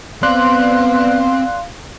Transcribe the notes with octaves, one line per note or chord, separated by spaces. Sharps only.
B3 C4 D5 F5 C6 F#6